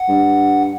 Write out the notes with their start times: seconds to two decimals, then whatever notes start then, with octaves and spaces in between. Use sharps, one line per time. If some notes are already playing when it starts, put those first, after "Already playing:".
Already playing: F#5
0.09 G2